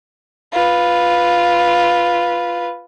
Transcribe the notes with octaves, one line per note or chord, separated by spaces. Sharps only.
F4 B4